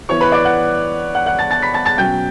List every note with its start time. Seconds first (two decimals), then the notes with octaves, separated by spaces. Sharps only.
0.08 E3 B3 E4 C#5 C#6
0.21 B4 B5
0.32 D5 D6
0.45 F#5 F#6
1.15 F#5 F#6
1.26 F#5 F#6
1.39 A5 A6
1.51 A5 A6
1.62 B5 B6
1.74 A5 A6
1.85 A5 A6
1.98 B2 F#3 C#4 G5 G6